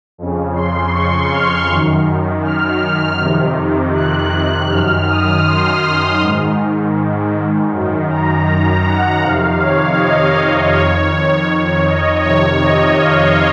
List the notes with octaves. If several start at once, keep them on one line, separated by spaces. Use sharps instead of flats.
F2 C#3
C6
C#6
F6
F#2 D#3
F6
F2 C3 D#3
F#6
F#6
F#2 D#3 F6
D#6
C6
G#2 D#3
F#2 D#3
A#5
F#5
F2 C3 D#3 F5
C#5
D#5
F2 D#3 C#5
C#5
D#5
F2 C3 D#3 C#5
D#5
F5